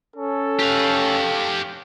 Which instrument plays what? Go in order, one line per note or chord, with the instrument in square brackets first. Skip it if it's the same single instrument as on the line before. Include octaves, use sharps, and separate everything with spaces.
[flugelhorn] C#4 [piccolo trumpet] A4
[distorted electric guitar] G4 F5